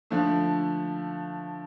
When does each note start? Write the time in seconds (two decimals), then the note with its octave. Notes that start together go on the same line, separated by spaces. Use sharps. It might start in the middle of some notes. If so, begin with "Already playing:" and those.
0.10 D3 F3 A3